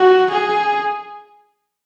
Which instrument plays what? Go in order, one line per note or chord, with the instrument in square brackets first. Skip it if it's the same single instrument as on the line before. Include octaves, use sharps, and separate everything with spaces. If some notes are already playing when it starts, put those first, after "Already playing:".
Already playing: [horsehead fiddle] F#4
G#4